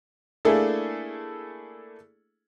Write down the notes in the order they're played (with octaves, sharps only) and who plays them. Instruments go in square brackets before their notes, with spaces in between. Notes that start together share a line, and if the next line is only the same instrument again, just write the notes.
[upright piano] A3 A#3 D4 E4 G#4 A4